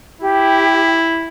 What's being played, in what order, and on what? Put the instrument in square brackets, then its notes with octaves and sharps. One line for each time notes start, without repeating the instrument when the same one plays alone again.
[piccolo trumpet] E4 [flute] G4